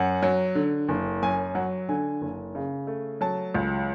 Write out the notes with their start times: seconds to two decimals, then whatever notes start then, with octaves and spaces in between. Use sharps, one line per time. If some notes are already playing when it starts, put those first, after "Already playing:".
Already playing: F#2 F#5
0.23 F#3
0.55 D3
0.89 F#1
1.22 F#2 G#5
1.55 F#3 F#5
1.89 D3 G#5
2.21 F#1
2.55 C#3
2.87 A3
3.21 F#3 A5
3.54 C#2